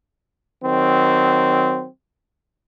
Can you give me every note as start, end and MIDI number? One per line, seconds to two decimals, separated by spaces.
0.64 1.86 51
0.64 1.86 54
0.64 1.86 60